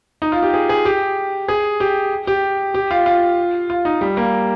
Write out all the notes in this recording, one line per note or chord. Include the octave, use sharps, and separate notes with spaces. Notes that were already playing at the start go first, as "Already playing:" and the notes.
D#4
F4
G4
G#4
G#4
G4
G#4
G4
G4
G4
F4
F4
F4
D#4
G3
A#3